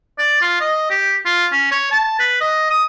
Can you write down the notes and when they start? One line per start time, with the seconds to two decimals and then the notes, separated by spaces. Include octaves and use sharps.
0.18 D5
0.41 F4
0.60 D#5
0.90 G4
1.25 F4
1.52 C#4
1.71 C#5
1.91 A5
2.19 B4
2.41 D#5
2.70 D#6